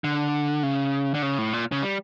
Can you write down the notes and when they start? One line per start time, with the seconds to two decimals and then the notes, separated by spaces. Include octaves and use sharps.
0.04 D3
0.63 C#3
1.14 D3
1.22 C#3
1.38 A2
1.53 A#2
1.72 C#3
1.83 G3